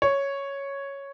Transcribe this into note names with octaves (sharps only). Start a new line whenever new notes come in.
C#5